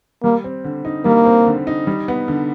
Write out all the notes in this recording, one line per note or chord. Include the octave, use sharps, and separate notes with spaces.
G3 A#3
C4
D3
D#4
G3 A#3
C4
D3
D#4
G3
B3
D3